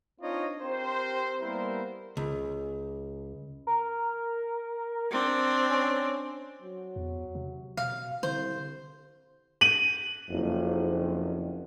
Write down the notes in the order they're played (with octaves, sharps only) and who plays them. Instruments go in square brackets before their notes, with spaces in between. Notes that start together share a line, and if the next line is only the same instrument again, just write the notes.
[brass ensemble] C4 D4 D#4 F4 C#5 D#5
C4 G4 A#4 C5
G3 A#3 B3 E4 A#4 C5
[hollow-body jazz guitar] C#2
[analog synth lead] A#4
[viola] C4 D4
[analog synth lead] C#4
[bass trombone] F#3
[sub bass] E2
C3
[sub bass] B2 [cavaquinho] F5
[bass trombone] C2 [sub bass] D3 [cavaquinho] C5
[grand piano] D#7 F#7
[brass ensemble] F#1 F2